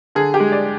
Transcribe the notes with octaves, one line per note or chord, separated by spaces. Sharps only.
D3 G#4
G4
G#3
D5